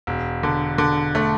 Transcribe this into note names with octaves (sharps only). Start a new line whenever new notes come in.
E1
D3
D3
A3